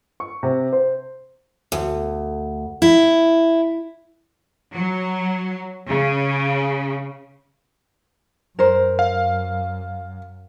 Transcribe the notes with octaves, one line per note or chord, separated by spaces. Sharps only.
C#6
C3
C5
D2
E4
F#3
C#3
F#2 A#4 C5
F5